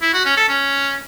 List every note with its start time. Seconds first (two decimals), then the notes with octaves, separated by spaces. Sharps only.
0.02 E4
0.14 F#4
0.25 C#4
0.37 A4
0.49 C#4